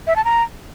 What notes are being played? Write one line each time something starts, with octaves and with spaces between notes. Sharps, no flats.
E5
A5
A#5